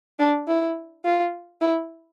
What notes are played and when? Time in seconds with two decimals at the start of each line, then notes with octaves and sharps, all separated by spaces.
0.19 D4
0.48 E4
1.05 F4
1.61 E4